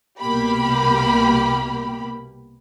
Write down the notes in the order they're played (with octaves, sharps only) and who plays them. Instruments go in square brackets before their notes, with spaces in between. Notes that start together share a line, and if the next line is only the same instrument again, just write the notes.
[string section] C2 B2 A#3 G4 B5